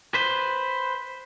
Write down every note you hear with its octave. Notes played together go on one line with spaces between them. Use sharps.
B4 C5